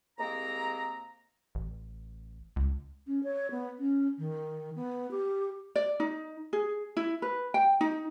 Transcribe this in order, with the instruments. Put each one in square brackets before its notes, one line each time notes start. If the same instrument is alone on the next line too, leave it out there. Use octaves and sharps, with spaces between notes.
[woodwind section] C2 G#3 A#3 C4 A#5
[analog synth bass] A1
C#2
[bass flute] C#4
C#5
B3
C#4
D#3
B3
G4
[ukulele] D5
D#4
G#4
E4
B4
G5
D#4